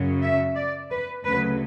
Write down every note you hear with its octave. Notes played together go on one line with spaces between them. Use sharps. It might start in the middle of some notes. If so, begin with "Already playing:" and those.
Already playing: F#2 C#3 F#3
E5
D5
B4
D2 C#3 F#3 B4